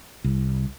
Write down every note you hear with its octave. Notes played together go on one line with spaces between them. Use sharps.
C2